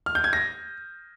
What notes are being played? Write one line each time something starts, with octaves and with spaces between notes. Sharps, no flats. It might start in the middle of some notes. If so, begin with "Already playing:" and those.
F6
G6
G#6
A#6